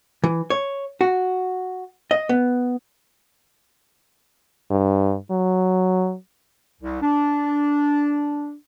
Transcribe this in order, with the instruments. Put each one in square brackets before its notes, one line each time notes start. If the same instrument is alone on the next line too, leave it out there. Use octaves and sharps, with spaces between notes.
[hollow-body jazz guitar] E3
C#5
F#4
D#5
B3
[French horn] G2
F#3
[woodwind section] C2
D4